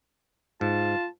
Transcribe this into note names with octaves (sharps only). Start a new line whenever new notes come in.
G#2 F4 A5